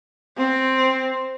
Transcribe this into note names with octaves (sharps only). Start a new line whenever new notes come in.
C4